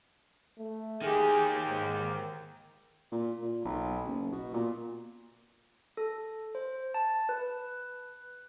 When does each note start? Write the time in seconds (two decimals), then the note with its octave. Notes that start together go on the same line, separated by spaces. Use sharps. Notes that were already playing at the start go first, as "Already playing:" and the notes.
0.58 A3
1.02 D#3 G4 G#4
1.69 G#2
3.12 A#2
3.42 A#2
3.65 B1
4.05 F#1
4.31 B2
4.54 A#2
5.97 A4
6.55 C5
6.94 A5
7.29 B4